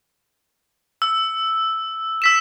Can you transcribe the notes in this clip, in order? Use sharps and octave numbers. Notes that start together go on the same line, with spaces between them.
E6
E6 B6 E7